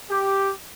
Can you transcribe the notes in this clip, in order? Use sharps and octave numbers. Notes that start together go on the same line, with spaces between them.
G4